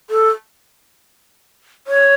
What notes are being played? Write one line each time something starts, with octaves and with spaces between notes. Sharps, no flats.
A4
C#5